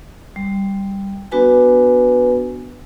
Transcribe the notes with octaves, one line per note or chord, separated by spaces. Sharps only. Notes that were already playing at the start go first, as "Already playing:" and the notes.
G3
B3 D4 F#4 B4 G#5